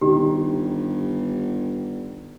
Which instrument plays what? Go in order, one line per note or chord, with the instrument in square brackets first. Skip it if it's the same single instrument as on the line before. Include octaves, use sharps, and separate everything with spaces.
[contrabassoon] G1 [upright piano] D#3 [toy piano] G4